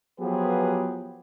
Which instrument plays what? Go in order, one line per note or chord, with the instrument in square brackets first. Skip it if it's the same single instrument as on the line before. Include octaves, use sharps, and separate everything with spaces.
[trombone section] F3 F#3 B3 G4 G#4 B4